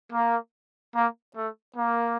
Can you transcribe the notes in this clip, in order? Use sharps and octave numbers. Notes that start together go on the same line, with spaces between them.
A#3
A#3
A3
A#3